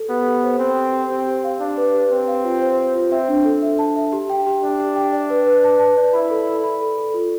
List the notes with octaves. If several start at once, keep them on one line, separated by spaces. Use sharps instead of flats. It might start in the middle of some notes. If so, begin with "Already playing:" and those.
Already playing: A4
B3 G4
G4
C5
C4 G5
G4
G4
C4 G4
G4
F5
D4 F5
B4
G4
C4 C5
F5
F4
C5
C5
F4
C4 E5
D4
A4
E5
A5
E5
G4
G5
G4
D4 G4
G4
G5
D5
B4
B4
A5
A5
D5
E4 B5
A4
B5
B5
A4
A4
F4